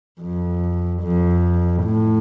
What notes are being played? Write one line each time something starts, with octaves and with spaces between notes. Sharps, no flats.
F2
F2
A2